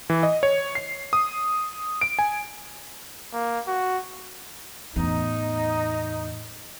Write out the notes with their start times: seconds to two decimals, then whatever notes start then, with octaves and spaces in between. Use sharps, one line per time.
0.10 E3
0.23 D#5
0.43 C#5
0.75 C7
1.13 D#6
2.01 D7
2.19 G#5
3.33 A#3
3.68 F#4
4.96 E2 A2 D#4